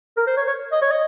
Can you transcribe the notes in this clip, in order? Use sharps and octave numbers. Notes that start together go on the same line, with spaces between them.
A#4
C5
C#5
C#5
D#5
C#5
D#5